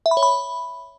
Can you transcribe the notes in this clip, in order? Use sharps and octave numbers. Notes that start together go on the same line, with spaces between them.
E5
B5
C#5
B5